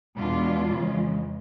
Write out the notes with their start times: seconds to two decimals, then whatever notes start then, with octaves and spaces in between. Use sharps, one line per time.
0.17 E2 B2 G#3 B3 D4 F4
0.71 F2 C#3 E3 G#3